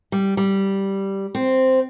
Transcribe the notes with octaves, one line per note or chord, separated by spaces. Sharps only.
G3
G3
C4